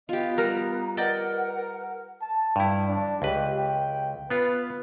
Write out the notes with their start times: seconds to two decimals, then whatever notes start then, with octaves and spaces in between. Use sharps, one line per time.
0.09 B3 F4 G4 D#5
0.38 G3 A#4 A#5
0.97 A#4 B4 D5 D#5 F#5 G5
1.53 A#4
2.21 A5
2.56 G2 E4 G5
2.88 D4
3.22 C#2 G4 B4
3.58 G5
4.30 B3 F4 B4